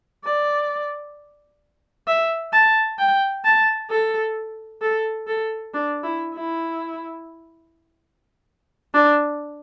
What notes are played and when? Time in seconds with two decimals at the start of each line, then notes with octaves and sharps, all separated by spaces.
0.25 D5
2.08 E5
2.53 A5
2.99 G5
3.45 A5
3.90 A4
4.82 A4
5.27 A4
5.74 D4
6.04 E4
6.35 E4
8.94 D4